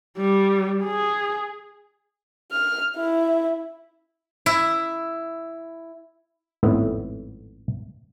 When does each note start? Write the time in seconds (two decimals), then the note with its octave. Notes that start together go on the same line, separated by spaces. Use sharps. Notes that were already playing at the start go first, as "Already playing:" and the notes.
0.18 G3
0.83 G#4
2.52 F6
2.97 E4
4.46 E4
6.63 G#1 F2 A2 B3 E5